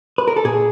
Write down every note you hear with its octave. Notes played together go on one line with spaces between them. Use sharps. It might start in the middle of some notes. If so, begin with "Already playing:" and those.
B4
A#4
A4
A#2 G#4